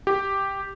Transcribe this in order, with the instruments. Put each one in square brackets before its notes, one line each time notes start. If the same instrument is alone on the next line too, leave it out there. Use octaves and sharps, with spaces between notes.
[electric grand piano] G4